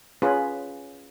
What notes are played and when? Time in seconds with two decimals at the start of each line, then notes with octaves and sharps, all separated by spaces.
0.22 C#4 F4 G#4 B4